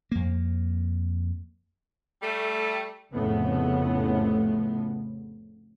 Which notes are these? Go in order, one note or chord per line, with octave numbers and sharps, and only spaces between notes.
F2 A#3
G3 A3
F1 F2 A2 C#3 B3